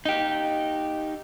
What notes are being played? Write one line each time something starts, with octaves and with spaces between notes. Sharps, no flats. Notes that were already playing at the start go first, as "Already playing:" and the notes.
D#4 G4